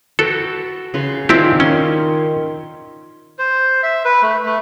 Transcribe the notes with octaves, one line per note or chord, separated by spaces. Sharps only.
F#4 A4 B4 G5
C#3 B4 C6
D#3 C4 E4 F4 G4 D5
C#4 C6
C5
E5
B4
A3
A3